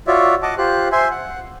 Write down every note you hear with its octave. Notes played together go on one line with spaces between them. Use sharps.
F4 F#4 C#5 D5 E5
D#5 F#5 A5 D6
F4 G4 C5 F#6
C5 E5 G#5 C6
F#5